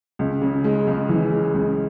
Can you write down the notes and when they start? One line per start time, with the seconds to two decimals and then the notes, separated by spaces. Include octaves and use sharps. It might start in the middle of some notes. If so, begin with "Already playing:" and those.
0.19 C#2
0.42 C#3
0.64 G#3
0.87 C#2
1.09 E3
1.31 G#3
1.54 C#2